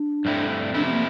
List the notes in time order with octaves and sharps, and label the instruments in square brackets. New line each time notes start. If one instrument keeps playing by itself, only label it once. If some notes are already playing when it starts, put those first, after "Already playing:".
Already playing: [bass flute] D4
[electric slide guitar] G2 D3 A3 C4 E4
[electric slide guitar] F2 C3 E3 A3 E4 [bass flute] D4
[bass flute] C4
A#3